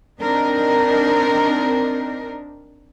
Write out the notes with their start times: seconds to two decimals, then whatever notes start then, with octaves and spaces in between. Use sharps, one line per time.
0.20 C4 D4 D#4 A#4